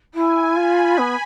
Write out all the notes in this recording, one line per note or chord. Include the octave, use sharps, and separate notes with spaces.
E4 G#5
F4 B5
B3